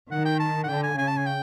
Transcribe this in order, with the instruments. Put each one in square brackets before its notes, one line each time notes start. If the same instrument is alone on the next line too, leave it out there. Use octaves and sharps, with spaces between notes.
[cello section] D#3 [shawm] F#5
[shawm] G5
A5
F#5
[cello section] D3 [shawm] G5
[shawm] G#5
[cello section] C#3 [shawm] G#5
[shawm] A5
G#5
G5